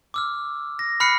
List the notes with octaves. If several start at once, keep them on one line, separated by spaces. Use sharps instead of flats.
D6 E6 F6
A#6
B5 F6 F#6 C7 C#7